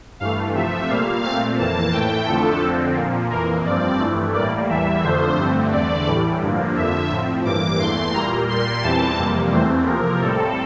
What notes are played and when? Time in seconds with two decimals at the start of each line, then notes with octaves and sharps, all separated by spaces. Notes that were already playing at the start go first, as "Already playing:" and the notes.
0.20 G2 E3 A3 F5
0.55 C3 F3 A3 E5
0.89 A#2 G3 A#3 F5
1.23 A#2 A3 C4 F5
1.59 F2 E3 A#3 A5
1.93 A2 E3 A3 G5
2.27 F2 D3 F3 A3 A4
2.62 F2 D3 F3 C4
2.96 A#2 F3 A#3
3.30 F2 E3 A#3 A#4
3.65 G2 F3 C4 D5
3.99 G2 E3 A3
4.34 A2 G3 A#3 D5
4.69 E2 E3 G3 E5
5.03 F2 D3 F3 A3 C5
5.37 G2 D3 A3 C4
5.72 E2 D3 A3 D5
6.07 A2 E3 G3
6.41 G2 D3 F3 A#3
6.76 F2 D3 F3 E5
7.11 A2 F3 C4
7.45 G2 E3 A#3 D6
7.79 E2 E3 A3 C6
8.14 A#2 G3 A#3 A#5
8.48 A#2 G3 A#3 C6
8.83 E2 E3 G3 C4 A5
9.18 F2 C3 G3 A#3
9.52 E2 E3 A3 C4 C5
9.86 C3 F3 A#3 A#4
10.21 A2 G3 C4 A4